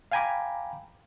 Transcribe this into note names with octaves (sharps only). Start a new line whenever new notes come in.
F5 G5 G#5 A#5 B5 D6